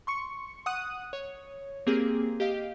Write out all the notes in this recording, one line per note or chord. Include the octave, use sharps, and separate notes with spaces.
C6 C#6 C#7
F#5 D#6 F#6 D#7
C#5
A#3 C4 G4 G#4
G4 D#5 F5